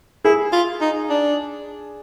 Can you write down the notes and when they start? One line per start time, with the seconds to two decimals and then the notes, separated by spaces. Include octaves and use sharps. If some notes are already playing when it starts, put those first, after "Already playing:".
0.25 E4 G#4
0.53 F4
0.81 D#4
1.09 D4